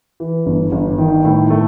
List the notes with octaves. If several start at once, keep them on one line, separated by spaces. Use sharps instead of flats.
E3
G1
G1
D#3
A2
A3